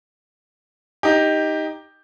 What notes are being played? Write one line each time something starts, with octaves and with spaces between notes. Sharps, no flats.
D#4 G4